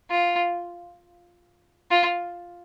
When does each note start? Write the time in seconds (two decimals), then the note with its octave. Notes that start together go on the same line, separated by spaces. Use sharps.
0.11 F4
1.91 F4